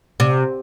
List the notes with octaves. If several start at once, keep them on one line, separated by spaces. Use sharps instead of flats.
C3